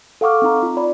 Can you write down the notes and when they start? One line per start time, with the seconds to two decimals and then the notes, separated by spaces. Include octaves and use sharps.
0.21 A4 F5 F#5 C#6 D6 F6
0.42 C4 D#4 A#5
0.63 F4
0.77 D5 B5